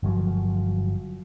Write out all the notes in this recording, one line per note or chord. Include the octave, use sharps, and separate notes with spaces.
G1 F3 F#3